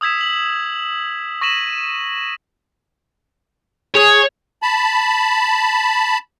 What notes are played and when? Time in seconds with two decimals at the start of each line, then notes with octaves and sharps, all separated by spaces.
0.01 D#6 E6 G#6 B6 E7
0.18 B6 F#7
1.41 C#6 A#6 B6 D#7 E7 F#7
3.95 G#4 C#5
4.62 A5 B5